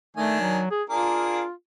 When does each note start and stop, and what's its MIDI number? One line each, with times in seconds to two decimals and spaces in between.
0.17 0.61 51
0.17 0.37 57
0.17 0.61 62
0.17 0.61 80
0.40 0.70 54
0.71 0.83 68
0.90 1.42 58
0.90 1.42 62
0.90 1.51 65
0.90 1.42 68